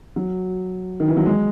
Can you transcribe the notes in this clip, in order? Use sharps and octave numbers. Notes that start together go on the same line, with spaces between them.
F#3
D#3
E3
F#3
G#3